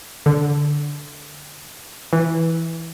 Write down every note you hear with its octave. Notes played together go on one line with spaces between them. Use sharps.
D3
E3